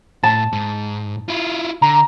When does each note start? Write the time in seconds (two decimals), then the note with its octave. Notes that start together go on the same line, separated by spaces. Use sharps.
0.23 A2 A5
0.52 G#2
1.28 E4 F4
1.82 D3 A#5